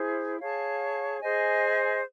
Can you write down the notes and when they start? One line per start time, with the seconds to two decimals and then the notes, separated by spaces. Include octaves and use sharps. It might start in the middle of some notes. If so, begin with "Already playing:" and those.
Already playing: E4 G#4 C5
0.40 G#4 C#5 F5 A5
1.20 G#4 C5 D#5 G#5